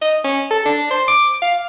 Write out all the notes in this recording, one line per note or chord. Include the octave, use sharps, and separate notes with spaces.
D#5
C#4
A4
D4
C5
D6
F5